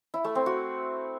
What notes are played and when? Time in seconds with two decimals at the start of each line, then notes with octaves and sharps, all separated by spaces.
0.14 E4
0.25 A3
0.35 C4
0.46 F#4